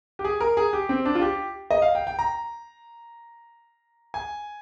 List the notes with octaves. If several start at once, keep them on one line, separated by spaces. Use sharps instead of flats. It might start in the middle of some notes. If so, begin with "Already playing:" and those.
G4
G#4
A#4
G#4
G4
C4
D4
F4
G4
D#5
F5
G5
G5
A#5
G#5